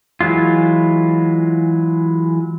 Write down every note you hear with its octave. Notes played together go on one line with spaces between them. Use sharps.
E3 F#3 G#3 F4